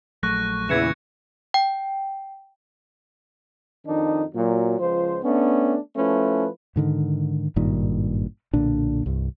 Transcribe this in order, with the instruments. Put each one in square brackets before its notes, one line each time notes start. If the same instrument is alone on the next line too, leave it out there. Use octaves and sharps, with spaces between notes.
[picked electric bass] A#1 F#3 A3 [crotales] C#6 F#6 A#6
[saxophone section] E2 E3 [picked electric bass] A#2 C#3 [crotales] G#6 C#7 E7
[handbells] G5
[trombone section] F2 D#3 D4 D#4
A#2 F#3
C#2 F3 C5
A3 B3 C#4 D4
F3 A3 C#4 E4 B4
[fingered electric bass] G#2 D3 D#3
G#1 G2 A#2 D#3
B1 A#2 D3 D4
C2 G2